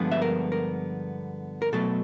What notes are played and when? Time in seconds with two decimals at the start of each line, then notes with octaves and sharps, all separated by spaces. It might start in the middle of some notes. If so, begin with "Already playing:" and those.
Already playing: G2 D3 F3 G#3 B3
0.12 E5
0.22 A#4
0.52 A#4
1.62 A#4
1.73 B2 F#3 A3 A4